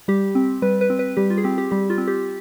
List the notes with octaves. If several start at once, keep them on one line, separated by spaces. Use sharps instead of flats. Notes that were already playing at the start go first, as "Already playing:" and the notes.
G3 G4
C4
G3 B4
B4
C4
B4
G3 G4
F4
G#4
C4 G4
G4
G3 G4
F4
C4
G4